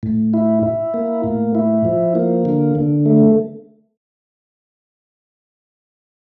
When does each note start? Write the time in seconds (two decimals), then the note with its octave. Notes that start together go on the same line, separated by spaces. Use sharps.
0.03 A2
0.34 E4
0.63 E4
0.94 A#3
1.24 A2
1.55 E4
1.85 F3
2.15 A#3
2.45 D3
2.75 D3
3.06 A3